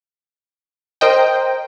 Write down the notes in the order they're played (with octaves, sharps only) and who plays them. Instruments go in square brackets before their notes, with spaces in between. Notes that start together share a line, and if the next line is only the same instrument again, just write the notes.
[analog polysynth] A#4 C5 D#5 G5